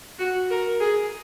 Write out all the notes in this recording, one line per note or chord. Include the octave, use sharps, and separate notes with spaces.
F#4
A#4
G#4